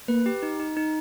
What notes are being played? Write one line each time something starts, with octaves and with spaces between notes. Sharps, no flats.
A#3 B4
G4
D#4
D#4
D#4